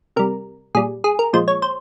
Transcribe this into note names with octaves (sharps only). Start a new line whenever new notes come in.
C3 G3 A#4
A#2 G3 G#4
G#4
A#4
A#2 F3 G#3 C5
C#5
C5